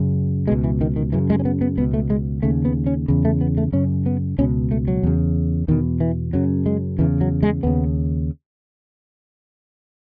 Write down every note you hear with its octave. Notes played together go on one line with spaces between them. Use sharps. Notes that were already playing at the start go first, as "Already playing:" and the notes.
Already playing: F#2 C#3
C#2 B2 G#3
E3
D#3
D#3
F#2 C#3 E3
G#3
C#4
B3
B3
C#2 B2 B3
A3
G#3
D#2 C#3 A3
B3
C#4
E2 C#3
A3
B3
A3
F#2 C#3 C#4
B3
C#2 B2 C#4
A3
F#3
E2 C#3
E2 B2 D#3
E3
F#2 C#3 F#3
G#3
E2 C#3 E3
F#3
G#3
D#2 C#3 B3